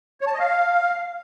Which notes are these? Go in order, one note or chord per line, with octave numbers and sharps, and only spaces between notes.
C#5
A5
D#5
F5